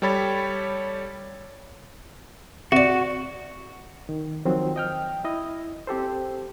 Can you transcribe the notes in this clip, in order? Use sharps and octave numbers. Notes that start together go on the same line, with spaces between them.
G3 G4 A4 C#5 B5 A6
C3 F#4 D5
D#3
D#3 F3 F#3 C4
D#5 G5 F6
E4 D#5
C4 G4 A4 C5